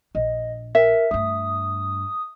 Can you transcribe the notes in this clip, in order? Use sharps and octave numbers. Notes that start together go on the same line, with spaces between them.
A#1 D#5
A#4 E5
G2 A3 D#6